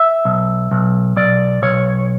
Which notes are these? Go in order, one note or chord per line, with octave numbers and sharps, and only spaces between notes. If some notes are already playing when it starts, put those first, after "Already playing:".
Already playing: E5
B1
B1
B1 D5
B1 C#5